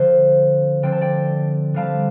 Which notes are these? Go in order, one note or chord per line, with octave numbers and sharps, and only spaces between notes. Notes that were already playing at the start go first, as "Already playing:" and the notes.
Already playing: D3 F3 C4 C5 F5
D3 F3 C4 G5
A5
D5 G5
D3 G3 C4 F5 A5